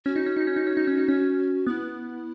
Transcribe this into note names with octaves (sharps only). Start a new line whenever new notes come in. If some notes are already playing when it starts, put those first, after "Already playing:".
C#4 F#4
D#4
C#4
D#4
C#4
D#4
C#4
D#4
C#4
D#4
C#4
B3 E4